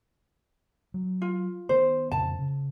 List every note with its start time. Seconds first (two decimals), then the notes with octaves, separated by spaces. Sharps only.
0.94 F#3
1.22 F4
1.69 D#3 B3 C5
2.12 F2 A#2 C#3 A5
2.39 C#3